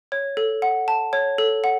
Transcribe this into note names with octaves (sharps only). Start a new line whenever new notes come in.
C#5
A4
F#5
A5
C#5
A4
F#5